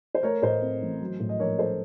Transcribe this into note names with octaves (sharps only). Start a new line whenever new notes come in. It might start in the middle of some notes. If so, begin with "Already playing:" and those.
C5
A3 A#4 C#5
A2 C5 D#5
C4
A1
F#3
A2
D#5
A#1 A#4 C#5
A4 C5